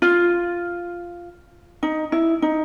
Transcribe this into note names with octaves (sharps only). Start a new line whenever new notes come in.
F4
D#4
E4
D#4